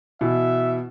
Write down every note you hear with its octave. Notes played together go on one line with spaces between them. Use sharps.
B2 E3 E5